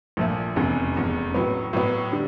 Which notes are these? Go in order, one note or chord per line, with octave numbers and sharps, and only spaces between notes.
A#1 A#2 F3 A3
F1 E2 C#3
F1 E2 C#3
A2 F#3 B3
A2 F#3 B3
D3 G3